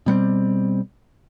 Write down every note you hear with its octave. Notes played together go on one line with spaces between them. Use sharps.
B2 G3 B3 C4